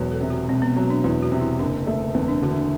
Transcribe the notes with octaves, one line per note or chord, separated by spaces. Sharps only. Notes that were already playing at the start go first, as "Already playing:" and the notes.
Already playing: E1 E2 F#3
A4
C3
F#4
E1 C4
B3
F#3 C4
D4
E2 E4
F#4
C3
E4
F#1 D4
A3
E2 C4
D4
D3 F#4
D4